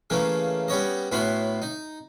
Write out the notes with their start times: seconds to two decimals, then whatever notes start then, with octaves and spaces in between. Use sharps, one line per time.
0.10 C#3 E3 A3 A#3 C#4
0.68 G3 B3 C#4 C#5 D#5
1.12 A2 B3 C#4 F#4 B5 C6
1.62 D#4